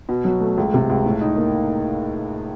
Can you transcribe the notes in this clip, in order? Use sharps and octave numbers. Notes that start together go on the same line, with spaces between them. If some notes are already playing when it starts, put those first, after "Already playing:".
B2
F#3
A3
C#2
C3
C#2
A2
D#4
A#3